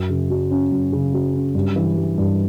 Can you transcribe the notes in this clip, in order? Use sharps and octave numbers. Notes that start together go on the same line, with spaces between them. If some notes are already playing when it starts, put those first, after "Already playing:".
Already playing: F#2
C#3
F#3
C#4
F#2
C#3
F#3
C#4
G2
E3
G3
G2